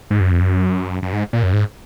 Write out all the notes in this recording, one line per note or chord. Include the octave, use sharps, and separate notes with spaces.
G#2
F#2
F2
F#2
F#2
G#2
A#2
F#2
G#2